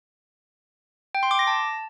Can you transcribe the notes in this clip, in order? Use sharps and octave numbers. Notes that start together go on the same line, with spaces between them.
G5
C6
D6
A#6
A5